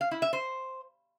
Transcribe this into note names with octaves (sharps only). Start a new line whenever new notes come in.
F5
E4
E5
C5